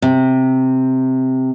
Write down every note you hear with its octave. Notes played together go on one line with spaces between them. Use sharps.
C3